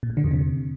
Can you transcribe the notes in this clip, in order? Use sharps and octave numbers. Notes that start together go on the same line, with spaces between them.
A#2
A2
D3
E2
C3